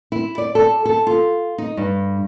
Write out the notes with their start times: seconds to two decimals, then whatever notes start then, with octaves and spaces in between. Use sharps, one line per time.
0.12 E4
0.38 D5
0.55 A4
0.85 A4
1.07 F4
1.58 D#4
1.77 G2